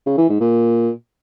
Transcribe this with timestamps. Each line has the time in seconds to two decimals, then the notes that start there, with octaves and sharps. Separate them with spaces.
0.06 C#3
0.18 E3
0.29 G#2
0.41 A#2